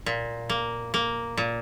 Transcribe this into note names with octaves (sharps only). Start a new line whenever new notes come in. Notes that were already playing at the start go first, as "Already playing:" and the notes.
A#2
A#3
A#3
A#2